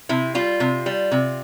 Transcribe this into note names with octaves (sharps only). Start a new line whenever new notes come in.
C3 E4
G3 F4
C3
G3
C3